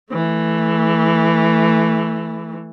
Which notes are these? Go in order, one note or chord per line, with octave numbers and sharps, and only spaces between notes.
E3 A3